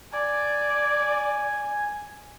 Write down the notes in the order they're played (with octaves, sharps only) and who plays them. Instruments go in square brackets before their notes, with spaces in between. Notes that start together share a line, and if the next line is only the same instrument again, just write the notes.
[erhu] D5 [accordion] G#5